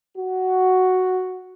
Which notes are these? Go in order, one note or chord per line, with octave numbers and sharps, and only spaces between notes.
F#4